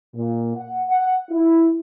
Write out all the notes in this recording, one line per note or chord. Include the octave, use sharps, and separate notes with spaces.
A#2
F#5
F#5
E4